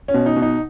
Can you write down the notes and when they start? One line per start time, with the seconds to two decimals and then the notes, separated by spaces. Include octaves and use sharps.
0.08 C#4
0.14 B2
0.26 D#4
0.37 B2
0.42 D#4